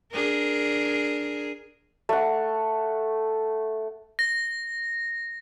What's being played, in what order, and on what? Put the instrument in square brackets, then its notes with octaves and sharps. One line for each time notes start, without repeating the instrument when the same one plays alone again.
[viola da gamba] D4 G#4 A#4
[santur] A3 F#5
[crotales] A#6